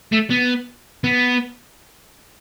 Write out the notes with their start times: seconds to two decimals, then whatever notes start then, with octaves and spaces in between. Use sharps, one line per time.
0.12 A3
0.30 B3
1.04 B3